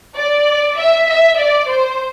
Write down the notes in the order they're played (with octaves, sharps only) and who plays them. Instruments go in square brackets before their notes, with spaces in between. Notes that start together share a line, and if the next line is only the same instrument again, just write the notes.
[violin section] D5
E5
E5
D5
C5